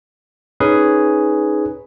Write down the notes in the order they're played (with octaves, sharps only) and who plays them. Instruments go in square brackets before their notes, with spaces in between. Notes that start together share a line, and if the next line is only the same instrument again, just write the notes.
[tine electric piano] C#4 D#4 G#4 B4